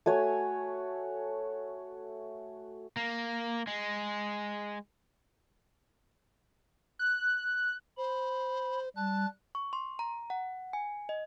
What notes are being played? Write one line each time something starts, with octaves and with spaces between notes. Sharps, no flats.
A3 F#4 C#5 G#5
A#3
G#3
F#6
C5 B5
G3 A5 F#6
C#6
C6
A#5
F#5
G#5
D#5